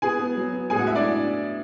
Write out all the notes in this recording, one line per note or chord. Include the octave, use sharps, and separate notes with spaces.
B3 G#4 G#5
B3
F#3
B3
A2 G#4 G#5
F#4 F#5
F#3 E4 E5
D4 D5